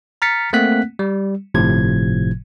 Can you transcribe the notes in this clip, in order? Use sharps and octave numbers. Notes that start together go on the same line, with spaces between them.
A#5 F6 A6 B6 C#7
A3 A#3 C4 F#5 F#6 B6
G3
G1 A2 C3 F3 G#6